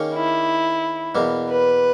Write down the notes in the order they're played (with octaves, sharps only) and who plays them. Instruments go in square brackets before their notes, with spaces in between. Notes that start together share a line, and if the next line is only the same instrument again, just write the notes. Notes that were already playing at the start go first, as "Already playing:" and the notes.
Already playing: [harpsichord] D#3 A#3 C#4 G#4 C#5
[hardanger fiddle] E4
[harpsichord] E2 B2 A#3
[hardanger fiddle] B4